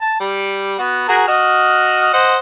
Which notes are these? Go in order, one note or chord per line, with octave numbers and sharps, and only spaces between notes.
A5
G3
B3 F#4
F#4 G#4 A#4
F#4 D#5 F6
C5 D#5 F#5